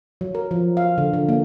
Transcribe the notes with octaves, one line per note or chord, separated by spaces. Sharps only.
F#3
A#4
F3
F5
D3
D3
A#3